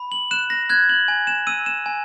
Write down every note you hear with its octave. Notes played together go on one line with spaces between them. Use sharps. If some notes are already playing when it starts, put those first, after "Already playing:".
Already playing: B5
F#7
F#6 E7
A#6
F#6 G#6
F#7
G#5
E7
E6 D#7
E7
G#5